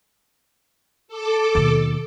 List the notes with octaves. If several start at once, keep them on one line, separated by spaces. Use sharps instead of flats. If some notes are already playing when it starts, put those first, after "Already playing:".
A4 D6
D#2 B2